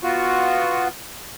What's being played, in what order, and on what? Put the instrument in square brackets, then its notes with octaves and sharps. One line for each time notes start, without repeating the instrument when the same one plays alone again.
[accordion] B3 F4 F#4